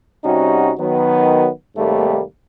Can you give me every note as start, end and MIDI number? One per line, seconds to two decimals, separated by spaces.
0.24 0.71 48
0.24 0.71 55
0.24 0.71 61
0.24 0.71 63
0.24 0.71 66
0.78 1.47 51
0.78 1.47 54
0.78 1.47 59
1.75 2.20 39
1.75 2.20 44
1.75 2.20 48
1.75 2.20 55
1.75 2.20 57
1.75 2.20 58